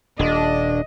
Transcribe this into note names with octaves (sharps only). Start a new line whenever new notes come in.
D#1 D4 D#5